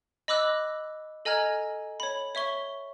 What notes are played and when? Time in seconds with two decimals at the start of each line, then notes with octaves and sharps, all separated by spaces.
0.28 D#5 B5 D6 E6 F#6
1.25 A4 D#5 G#5 A#5 F6 G#6
2.00 C#5 B5
2.35 C#5 E5 C#6 G7